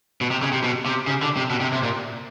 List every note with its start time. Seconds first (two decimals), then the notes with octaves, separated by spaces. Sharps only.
0.21 B2
0.31 C3
0.42 C#3
0.53 C3
0.64 B2
0.86 C3
1.07 C#3
1.22 D3
1.37 C3
1.50 B2
1.61 C3
1.72 C3
1.83 A#2